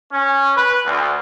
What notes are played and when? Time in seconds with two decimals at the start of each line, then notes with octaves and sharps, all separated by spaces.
0.12 C#4
0.56 B4
0.86 D2